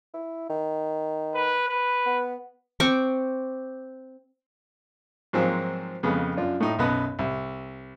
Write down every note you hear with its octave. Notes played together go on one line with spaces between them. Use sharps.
E4
D#3
B4
B4
B3
C4 C#6 D6
G#2 F3 F#3 G#3 A#3 C4
F2 C#3 G#3 B3
F#2 D4 F4
A2 D#4
B1 F#2 B3 B5 D#6 F#6
C2